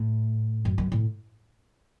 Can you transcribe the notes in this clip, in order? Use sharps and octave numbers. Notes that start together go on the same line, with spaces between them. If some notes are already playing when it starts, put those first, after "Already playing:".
Already playing: A2
F#2
F#2
A2